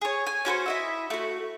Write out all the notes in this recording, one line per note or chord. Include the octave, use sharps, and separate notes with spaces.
G#4 C#5
G#5
C#4 F#4 B4 C5
E4 D#5 E5
A3 F#4